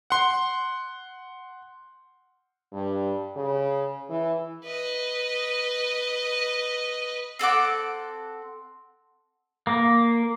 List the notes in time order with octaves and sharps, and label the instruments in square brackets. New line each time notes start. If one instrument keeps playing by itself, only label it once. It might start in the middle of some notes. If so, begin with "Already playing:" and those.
[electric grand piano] F#5 C6
[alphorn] G2
C#3
E3
[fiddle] B4 D#5
[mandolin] C4 A4 F#5 D6
[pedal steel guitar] A#3